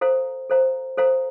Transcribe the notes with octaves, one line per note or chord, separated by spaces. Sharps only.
A4 C5 F5 A#5
A4 C5 F5 A#5
A4 C5 F5 A#5